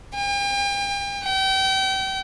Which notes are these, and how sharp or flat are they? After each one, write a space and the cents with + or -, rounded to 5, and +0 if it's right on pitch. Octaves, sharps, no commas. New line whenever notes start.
G5 +40
G5 -35